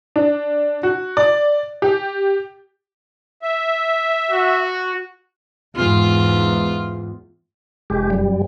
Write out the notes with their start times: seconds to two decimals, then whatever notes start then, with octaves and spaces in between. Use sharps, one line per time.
0.16 D4
0.83 F#4
1.17 D5
1.82 G4
3.42 E5
4.31 F#4
5.76 E2 G#2 F4
7.90 F1 G#3 G4
8.10 F#2 G3